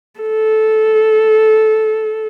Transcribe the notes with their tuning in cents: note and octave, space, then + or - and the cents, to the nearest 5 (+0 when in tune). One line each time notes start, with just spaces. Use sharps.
A4 -15